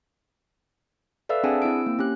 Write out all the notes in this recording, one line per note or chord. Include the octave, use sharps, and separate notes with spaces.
A4 B4 D5 E5 F5 E6
C4 D4 G#4 F#5 G#5 A5
C4 E4 E6 D7
A#3
C#4 G4 F#6